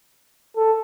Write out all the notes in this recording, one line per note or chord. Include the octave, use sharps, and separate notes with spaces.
A4